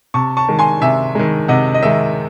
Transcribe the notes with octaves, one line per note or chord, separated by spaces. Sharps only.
C3 A5 C#6
A5 C#6
D#3 G#3
G#5 C6
C3 E5 G#5
D#3 G#3
C3 D#5 F#5
D#5
D#3 G#3 E5